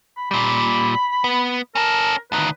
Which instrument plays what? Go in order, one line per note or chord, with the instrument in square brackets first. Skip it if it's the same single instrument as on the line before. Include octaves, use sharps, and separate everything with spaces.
[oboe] B5
[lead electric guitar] A#2 G3 [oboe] B5
[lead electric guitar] B3
[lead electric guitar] C#4 A4 [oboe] A#4
[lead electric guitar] D2 D#3 [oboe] B4